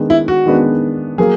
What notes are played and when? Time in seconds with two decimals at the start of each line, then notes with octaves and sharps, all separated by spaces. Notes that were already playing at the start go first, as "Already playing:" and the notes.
Already playing: D#3 G#3 B3 D4
0.10 E4
0.28 F#4
0.46 D#3 G#3 B3 D4
1.18 F#3 A#3 G#4